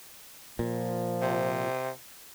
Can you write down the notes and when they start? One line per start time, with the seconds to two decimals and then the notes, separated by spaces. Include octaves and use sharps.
0.59 A#2 F3
1.22 C3